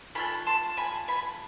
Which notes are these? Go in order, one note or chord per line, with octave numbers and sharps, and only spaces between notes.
A3 D4 F4 A4 G#5 B5
A5 C6
G#5 B5
G#5 B5